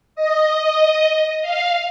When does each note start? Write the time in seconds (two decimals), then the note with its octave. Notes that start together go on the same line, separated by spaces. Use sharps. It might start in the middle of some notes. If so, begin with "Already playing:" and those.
0.15 D#5
1.41 F5